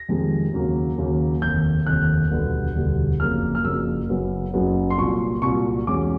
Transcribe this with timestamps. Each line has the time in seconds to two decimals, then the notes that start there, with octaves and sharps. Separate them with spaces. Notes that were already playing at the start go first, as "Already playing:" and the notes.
Already playing: A#6
0.09 F2 C3 D#3 G#3
0.53 D#2 C#3 F#3 A#3
0.98 D#2 C#3 F#3 A#3
1.42 F1 D#2 D#3 G6
1.87 F1 D#2 D#3 F#6
2.31 E1 D2 D3 G3 B3
2.76 E1 D2 D3 G3 B3
3.20 F#1 F2 C#3 F#3 A#3 F6
3.55 F6
3.65 F#1 F2 C#3 F#3 A#3 E6
4.09 F#1 F#2 C#3 F#3 B3
4.54 F#1 F#2 C#3 F#3 B3
4.90 C6
4.98 C2 A#2 F#3 C#6
5.42 C2 A#2 F#3 C#6
5.87 E2 B2 G#3 C#4 D6